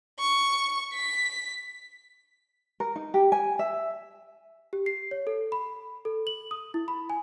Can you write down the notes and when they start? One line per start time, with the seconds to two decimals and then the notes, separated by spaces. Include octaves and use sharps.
0.19 C#6
0.94 B6
2.80 A#4
2.96 D#4
3.14 G4
3.32 G#5
3.59 E5
4.73 G4
4.86 C7
5.11 C#5
5.27 A4
5.52 B5
6.05 A4
6.27 F#7
6.51 D#6
6.74 E4
6.88 B5
7.10 G#5